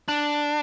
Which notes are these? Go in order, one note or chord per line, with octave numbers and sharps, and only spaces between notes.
D4